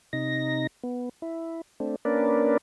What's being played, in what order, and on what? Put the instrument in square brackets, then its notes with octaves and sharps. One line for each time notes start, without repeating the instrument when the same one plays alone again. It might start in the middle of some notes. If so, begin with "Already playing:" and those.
[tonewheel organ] C3 D#4 A#6
B3
E4
A3 C4 D4
A#3 C#4 D4 A#4 B4 D5